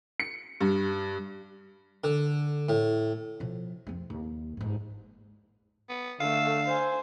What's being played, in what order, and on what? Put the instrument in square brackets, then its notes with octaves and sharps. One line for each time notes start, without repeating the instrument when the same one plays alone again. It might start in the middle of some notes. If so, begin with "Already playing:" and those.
[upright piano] C#7
G2
[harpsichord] D3
A2
[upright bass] B2 F3
F2 C4
D#2
G1 G#2
[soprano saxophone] B3
[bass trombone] D3 [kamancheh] A3 E6 [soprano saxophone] F5
[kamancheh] C5 G#5